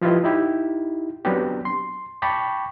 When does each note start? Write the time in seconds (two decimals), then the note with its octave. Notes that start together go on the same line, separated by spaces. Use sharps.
0.01 F3 E4 F4 G4 B4 D#5
0.24 D#4 E4 G4
1.25 F#3 B3 C4 D4 F#4 G4
1.65 C6
2.22 G5 A5 B5 C#6 D6